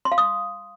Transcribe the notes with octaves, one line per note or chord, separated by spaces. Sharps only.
C6
F5
D#6